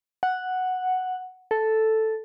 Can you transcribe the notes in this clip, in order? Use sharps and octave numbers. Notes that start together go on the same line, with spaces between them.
F#5
A4